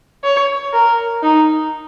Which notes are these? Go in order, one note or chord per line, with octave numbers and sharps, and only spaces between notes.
C#5
A#4
D#4